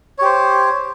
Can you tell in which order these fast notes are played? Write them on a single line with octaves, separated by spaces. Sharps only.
C#5 G4 C5